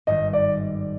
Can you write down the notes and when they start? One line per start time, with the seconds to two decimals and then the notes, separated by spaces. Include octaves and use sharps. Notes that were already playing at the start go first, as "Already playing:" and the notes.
0.07 G#1 G2 D#3 D#5
0.33 D5